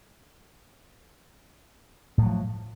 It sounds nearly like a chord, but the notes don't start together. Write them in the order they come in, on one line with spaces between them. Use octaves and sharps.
A2 F#3 F3